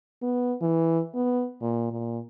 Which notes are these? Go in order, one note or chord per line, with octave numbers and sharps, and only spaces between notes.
B3
E3
B3
A#2
A#2